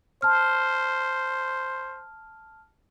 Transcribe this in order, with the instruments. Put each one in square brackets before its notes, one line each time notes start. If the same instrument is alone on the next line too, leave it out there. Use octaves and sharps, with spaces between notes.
[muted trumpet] C5 [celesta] A5 F6